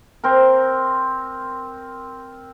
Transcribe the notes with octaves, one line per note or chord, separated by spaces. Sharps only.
C4 A#4